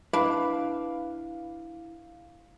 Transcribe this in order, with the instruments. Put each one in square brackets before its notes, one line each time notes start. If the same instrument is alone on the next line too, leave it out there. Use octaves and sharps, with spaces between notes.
[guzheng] D4 [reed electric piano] E4 [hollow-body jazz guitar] B4 [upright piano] F5